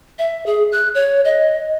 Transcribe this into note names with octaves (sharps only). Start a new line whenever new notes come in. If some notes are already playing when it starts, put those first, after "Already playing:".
E5
G#4
F#6
C#5
D#5